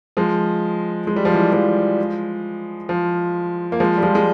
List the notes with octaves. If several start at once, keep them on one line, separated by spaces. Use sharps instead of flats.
F3 G#3
G#3
G3
F3
E3 G3
F3 G#3
F3
A#3
F3 G#3
G3
F3 G#3
G#3